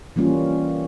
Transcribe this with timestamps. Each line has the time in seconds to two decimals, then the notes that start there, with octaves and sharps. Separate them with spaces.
0.16 E3 G3 A#3 C#4 F4